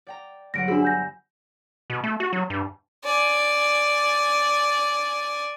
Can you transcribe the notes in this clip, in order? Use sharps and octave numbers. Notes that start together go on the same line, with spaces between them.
D5 G5 A#5
G1 F#3 F#5 A#6 D7
D4 F#4 G#4 C5 B5 E6
G#5 G6 A#6
B2
A3
F#4
F#3
G2
D5 G#5